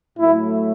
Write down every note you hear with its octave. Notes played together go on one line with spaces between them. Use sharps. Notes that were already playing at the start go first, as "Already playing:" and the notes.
A2 F#3 A3 E4